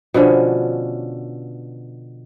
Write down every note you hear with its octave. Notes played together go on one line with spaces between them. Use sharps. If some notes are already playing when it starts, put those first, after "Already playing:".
B2 D3 F3 C#4